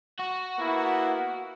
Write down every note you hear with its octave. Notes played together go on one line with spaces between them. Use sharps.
F#4
A#3 B3 E4